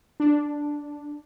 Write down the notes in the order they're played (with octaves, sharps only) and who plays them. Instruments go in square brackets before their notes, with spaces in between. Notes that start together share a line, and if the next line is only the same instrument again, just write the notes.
[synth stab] D4